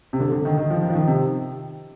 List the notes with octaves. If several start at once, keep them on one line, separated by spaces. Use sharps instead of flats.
C3
D3
D3
D#3
D#3
F3
D#3
F3
D#3
C3